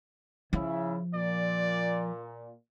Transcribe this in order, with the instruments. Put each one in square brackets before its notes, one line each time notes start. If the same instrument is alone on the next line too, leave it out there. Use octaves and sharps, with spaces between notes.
[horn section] C#3 E4 [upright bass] F3
[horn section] A#2 [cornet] D5